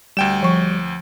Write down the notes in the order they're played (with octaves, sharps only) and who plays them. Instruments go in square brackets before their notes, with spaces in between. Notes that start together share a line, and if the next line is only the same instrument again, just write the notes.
[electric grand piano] D2 G5 E7 [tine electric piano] G3
[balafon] F3 C#6